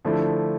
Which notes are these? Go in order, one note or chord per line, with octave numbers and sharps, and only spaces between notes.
D3 F3 A3 E4